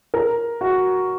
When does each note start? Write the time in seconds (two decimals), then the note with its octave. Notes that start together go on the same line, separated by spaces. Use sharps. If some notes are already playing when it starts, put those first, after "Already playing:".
0.14 A#4
0.61 F#4